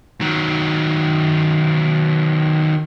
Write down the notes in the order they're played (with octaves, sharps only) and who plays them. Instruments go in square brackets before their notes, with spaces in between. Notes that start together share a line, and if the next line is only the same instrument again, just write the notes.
[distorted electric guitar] D#3 F#3